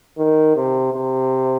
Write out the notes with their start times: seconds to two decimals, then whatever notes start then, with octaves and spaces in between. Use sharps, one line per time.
0.18 D#3
0.56 C3
0.93 C3